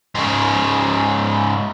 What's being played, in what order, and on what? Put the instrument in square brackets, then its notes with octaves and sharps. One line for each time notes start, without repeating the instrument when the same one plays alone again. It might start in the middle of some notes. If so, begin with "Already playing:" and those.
[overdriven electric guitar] G#2 C#3